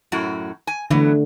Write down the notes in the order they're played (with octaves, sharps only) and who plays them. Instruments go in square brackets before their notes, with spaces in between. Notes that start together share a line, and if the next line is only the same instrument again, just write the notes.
[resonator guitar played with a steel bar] F#2 A2 F#4
G#5
[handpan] D3 A3 [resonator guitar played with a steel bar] E3 F#3 B3